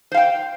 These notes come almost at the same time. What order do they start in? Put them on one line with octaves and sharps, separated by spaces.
C5 F5 G5